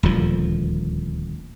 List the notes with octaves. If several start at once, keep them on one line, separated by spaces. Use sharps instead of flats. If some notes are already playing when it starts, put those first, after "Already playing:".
D#1 D2 F3